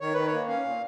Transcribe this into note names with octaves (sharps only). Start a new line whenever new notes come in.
D#3 C#5
D#3 B4
C#5
A#3
C#4 F5
A#2